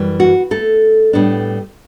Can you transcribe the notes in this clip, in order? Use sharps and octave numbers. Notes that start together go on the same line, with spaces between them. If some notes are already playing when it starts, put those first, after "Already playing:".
Already playing: F#2 E3 G3
F#4
A3 A4
A2 G3 B3 D4